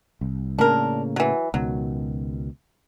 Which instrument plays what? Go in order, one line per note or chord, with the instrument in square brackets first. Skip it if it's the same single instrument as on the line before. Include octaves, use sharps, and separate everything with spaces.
[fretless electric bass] C2
[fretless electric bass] A2 C#3 A#3 [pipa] D4 A#4
[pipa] E3 F#3
[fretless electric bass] C#2 B2 D#3 [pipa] F#3